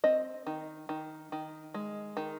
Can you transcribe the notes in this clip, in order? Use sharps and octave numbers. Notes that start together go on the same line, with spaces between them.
C4 D#5
D#3
D#3
D#3
G#3
D#3